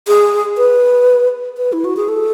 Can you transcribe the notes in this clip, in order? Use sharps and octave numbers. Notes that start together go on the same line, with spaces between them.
G#4
B4
B4
E4
F#4
G#4
A4